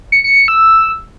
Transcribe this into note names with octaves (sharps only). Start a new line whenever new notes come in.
C#7
C#7
C#7
E6